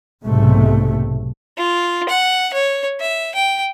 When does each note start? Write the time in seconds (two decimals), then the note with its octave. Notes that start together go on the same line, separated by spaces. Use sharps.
0.25 B1 G#2 C3 A3
1.58 F4
2.09 F#5
2.53 C#5
3.01 E5
3.35 G5